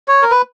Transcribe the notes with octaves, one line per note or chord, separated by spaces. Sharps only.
C#5
A#4
B4